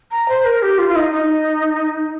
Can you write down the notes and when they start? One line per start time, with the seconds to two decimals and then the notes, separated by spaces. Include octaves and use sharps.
0.11 A#5
0.28 C5
0.45 A#4
0.62 G4
0.78 F4
0.89 F4
0.96 D#4
1.12 D#4